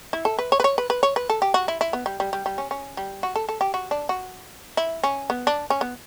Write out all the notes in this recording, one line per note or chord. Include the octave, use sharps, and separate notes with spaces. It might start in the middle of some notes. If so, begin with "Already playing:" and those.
E4
A4
B4
C#5
B4
C#5
B4
B4
C#5
B4
A4
G4
F#4
E4
E4
B3
G3
G3
G3
G3
C#4
C#4
G3
F#4
A4
A4
G4
F#4
D4
F#4
E4
C#4
B3
D4
C#4
B3